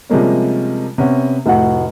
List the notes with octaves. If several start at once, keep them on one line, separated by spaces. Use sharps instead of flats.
C3 F3 G3 G#3 A#3 C#4
C3 B3 C#4
F1 A2 F#4 F#5